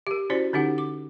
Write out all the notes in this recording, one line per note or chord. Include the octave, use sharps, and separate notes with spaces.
G4 A#4
C#4 E4 F#4 C5 D5
D3 C#4 D#4 G4 F#5
D6